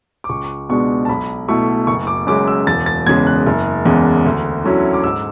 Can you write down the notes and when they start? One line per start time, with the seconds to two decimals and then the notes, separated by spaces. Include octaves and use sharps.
0.24 D6
0.29 C#2 C#6
0.69 B2 G#3 B3 D4 C#6
1.05 A5
1.09 B1 B5
1.48 B2 A3 E4 C#6
1.87 F#1 C#6
2.07 D6
2.27 F#2 C#3 G#3 D6
2.48 E6
2.67 E1 A6
2.86 A6
3.06 E2 G#6
3.09 C#3 G#3
3.27 F#6
3.47 F#1
3.85 E2 C#3 E3 G#3
4.25 D2
4.64 D3 F#3 C#4 E4
4.93 D6
5.04 G#2 E6